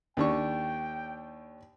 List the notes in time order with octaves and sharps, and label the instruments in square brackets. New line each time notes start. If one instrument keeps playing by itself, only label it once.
[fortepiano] D#2 D4 C#6 [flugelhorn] G5